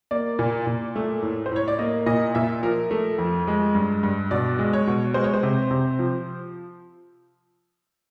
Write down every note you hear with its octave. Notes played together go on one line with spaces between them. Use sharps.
A#3 D5
A#2
A#2
A3
A2
C5
A2 C#5
D5
A#3 D#5
A#2 D#5
A#2 E5
F3 A#4
A3
F2
G#3
G2
G2
B2 D5
G#3
C#5
B2
G#3 C5
C#5
C5
C3
C3
F3